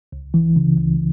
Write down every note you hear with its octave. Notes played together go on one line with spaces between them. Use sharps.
C#2
E3
C#3
C#2